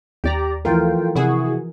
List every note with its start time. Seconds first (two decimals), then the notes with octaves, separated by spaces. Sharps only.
0.24 D#2 G4 D5 A#5
0.65 E3 F3 A3 F4 A#4 G5
1.16 C3 E4 F#4 G#4